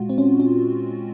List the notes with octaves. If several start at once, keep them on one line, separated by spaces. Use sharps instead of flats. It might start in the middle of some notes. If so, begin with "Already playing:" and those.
Already playing: A#2 G#3 F4 F#4
C4
C#4
C#4